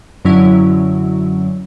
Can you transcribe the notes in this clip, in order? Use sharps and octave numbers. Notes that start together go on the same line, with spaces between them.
F#2 D3 F#3 C#4 E4